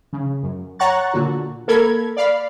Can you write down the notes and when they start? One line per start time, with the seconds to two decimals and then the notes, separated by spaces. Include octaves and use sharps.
0.13 C#3
0.43 F#2
0.79 C#5 F#5 A#5 C#6 F#6 A6
1.13 A#2 D3 F#4
1.68 A#3 A4 A#4 B5 G#6
2.17 D5 F5 B5